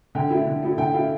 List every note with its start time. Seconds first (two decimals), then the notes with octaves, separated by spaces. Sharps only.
0.15 D3 G5
0.30 A3 E4
0.47 D3
0.63 A3 E4
0.78 D3 G5
0.94 A3 E4 F5